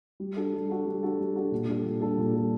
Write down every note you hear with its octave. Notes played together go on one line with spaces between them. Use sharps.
G3
D4 F#4 A4
G3
D4 F#4 A4
G3
D4 F#4 A4
G3
D4 F#4 A4
A#2
G3 D4 A4
A#2
G3 D4 A4
A#2
G3 D4 A4